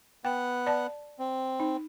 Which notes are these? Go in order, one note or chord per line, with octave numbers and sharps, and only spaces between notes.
B3 F#5 G5
D5 A5
C4
D#4